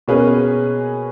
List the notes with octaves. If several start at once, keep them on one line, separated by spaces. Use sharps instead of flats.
B2 A#3 C#4 G#4 B4